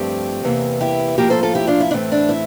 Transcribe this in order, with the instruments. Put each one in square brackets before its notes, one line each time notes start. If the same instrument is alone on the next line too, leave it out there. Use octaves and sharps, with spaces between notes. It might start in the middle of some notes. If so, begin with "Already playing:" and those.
Already playing: [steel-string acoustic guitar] G2 F3 A3 C4 G4
E2 C3 E3 A#3
E4 G4
A2 F3 A#3 G4 A#4
A4 C5
F4 A4
E4 G4
D4 F4
E4
A2 E3 A3 C4 D4
D4
E4